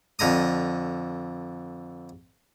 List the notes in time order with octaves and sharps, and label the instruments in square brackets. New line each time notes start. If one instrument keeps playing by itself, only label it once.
[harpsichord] F2 D3 A#5 D#6